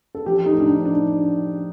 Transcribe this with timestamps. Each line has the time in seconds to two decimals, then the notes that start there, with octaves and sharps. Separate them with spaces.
0.15 A4
0.26 F3 G4
0.46 D#4
0.52 A2
0.60 D4
0.65 D#4
0.79 F3
0.85 D4